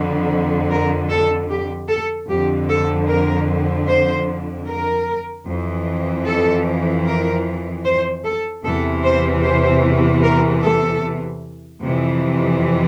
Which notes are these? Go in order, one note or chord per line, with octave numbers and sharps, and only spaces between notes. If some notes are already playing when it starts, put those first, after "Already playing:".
Already playing: F2 D3
A#4
A4
G4
A4
F2 D3 G4
A4
A#4
C5
A#4
F2 E3
A4
A#4
C5
A4
E2 C3 E3 A4
C5
C5
A#4
A4
F2 C3 E3